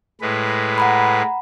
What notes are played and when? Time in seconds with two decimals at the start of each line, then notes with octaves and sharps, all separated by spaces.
0.21 A2 G#3 B4
0.78 F#5 A#5 B5